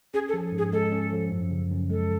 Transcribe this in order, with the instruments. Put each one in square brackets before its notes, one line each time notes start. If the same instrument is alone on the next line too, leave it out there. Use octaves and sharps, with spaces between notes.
[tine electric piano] C#4 [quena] G#4
[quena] A4
[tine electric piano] F3
G#2
[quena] G#4
[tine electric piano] G#3 [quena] A4
[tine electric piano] C#4
F3
F#2
C#3
F#2
[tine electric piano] G#3 [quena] A4